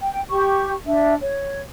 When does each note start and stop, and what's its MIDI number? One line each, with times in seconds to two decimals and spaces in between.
0.01 0.21 79
0.30 0.72 67
0.30 0.72 85
0.86 1.14 62
0.86 1.14 76
1.21 1.60 73